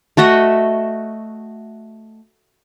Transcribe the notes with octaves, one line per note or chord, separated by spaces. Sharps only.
A3 F#4 D#5 E5